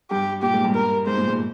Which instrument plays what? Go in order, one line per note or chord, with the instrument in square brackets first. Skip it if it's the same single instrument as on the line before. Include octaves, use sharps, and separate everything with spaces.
[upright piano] G2 [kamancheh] G4
[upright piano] A#2 [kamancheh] G4
[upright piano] G#2
G2
[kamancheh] A#4
[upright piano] G#2 [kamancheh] C5
[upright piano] A#2
G#2